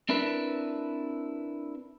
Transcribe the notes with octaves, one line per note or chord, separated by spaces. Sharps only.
C4 D4 E4 A#4 B4